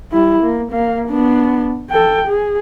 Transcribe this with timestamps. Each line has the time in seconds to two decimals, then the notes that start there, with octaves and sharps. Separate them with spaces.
0.12 G3 E4
0.43 A#3
0.71 A#3 F5
1.08 B3 D4
1.91 A4 G5
2.28 G#4